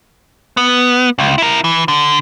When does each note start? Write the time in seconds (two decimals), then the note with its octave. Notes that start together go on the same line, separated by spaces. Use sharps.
0.57 B3
1.19 C#2
1.38 E4 A#4
1.64 E3
1.88 D3